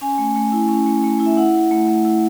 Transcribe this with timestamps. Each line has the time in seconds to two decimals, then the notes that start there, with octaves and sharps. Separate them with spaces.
0.01 C#4 G#5
0.18 A3
0.36 A3
0.52 E4
0.69 C#4
0.86 A3
1.04 A3
1.20 E4
1.26 E5
1.37 E4 F#5
1.54 E4
1.71 A3
1.88 A3
2.05 E4